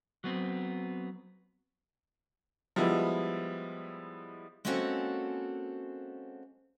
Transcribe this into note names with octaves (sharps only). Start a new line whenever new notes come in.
F#3 B3 C4
F3 G3 G#3 B3 E4
G#3 A#3 C4 C#4 F#4 A4